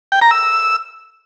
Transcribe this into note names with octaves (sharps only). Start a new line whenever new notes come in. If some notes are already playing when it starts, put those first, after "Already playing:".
G5
A#5
E6